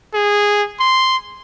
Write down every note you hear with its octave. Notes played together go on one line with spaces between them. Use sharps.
G#4
C6